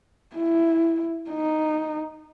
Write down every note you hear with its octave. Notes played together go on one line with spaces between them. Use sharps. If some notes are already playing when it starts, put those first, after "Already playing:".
E4
D#4